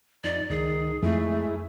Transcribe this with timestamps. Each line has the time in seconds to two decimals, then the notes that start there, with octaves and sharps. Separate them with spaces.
0.24 F2 D#4 D5
0.50 C#2 D#3 G#4
1.03 F2 G#3 A3 E4